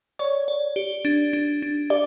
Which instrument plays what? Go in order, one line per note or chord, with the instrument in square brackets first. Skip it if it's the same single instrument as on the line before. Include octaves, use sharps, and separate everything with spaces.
[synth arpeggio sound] C#5 [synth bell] D5
[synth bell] D5
G4
D4
D4
D4
[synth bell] G4 [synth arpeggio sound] D5